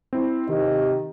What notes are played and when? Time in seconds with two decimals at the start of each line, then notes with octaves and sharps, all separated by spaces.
0.13 C4 E4
0.49 C3 D#3 G4 D#5